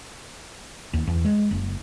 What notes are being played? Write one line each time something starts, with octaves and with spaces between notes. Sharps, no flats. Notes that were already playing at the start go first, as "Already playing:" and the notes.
D#2
E2
G#3
F#1